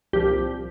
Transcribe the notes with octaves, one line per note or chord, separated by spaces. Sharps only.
C2 A#2 F3 G4